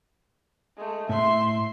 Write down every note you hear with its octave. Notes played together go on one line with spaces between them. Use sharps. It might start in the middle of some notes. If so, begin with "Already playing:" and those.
G#3 A3
A2 E5 C6